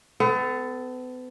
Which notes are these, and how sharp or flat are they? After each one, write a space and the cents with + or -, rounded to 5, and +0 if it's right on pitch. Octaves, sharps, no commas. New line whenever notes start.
B3 +40 A4 +0